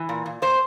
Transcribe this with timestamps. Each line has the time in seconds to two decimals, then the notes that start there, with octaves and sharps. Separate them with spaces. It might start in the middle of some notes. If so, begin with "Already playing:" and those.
Already playing: E3
0.09 A#2
0.26 A#2
0.42 A#2 C5